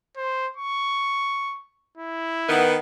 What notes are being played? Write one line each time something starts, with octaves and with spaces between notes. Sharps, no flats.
C5
C#6
E4
D#3 B3